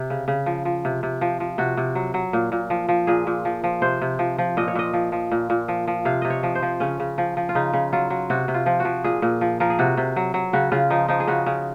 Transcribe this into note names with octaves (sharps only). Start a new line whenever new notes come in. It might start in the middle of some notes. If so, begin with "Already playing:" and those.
Already playing: C3
C#3
C#3
F3
F3
C3
C3
F3
F3
C3 F#4
C3
F#3
F#3
A#2
A#2
F3
F3
A#2 G#4
A#2
F3
F3
C3 C5
C3
F3
F3
A#2 D#5
C#5
A#2 D#5
F3
F3
A#2
A#2
F3
F3
C3 F5
C3 D#5
C#5
F3
C5
F3
C#3 C#4
C#3
F3
F3
F4
C#3 D#4
C#3
F#3 F4
F#3
C3 F#4
C3
F4
F3
F#4
F3
A#2 G#4
A#2
F3
F3 A#4
G#4
C3 F#4
C3
F#3
F#3
C#3 F#4
C#3 F4
F3 D#4
F3 D#4
G#4
C#3 F#4
C#3